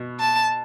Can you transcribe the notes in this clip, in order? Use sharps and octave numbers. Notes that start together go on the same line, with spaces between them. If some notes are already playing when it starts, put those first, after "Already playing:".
Already playing: B2
A5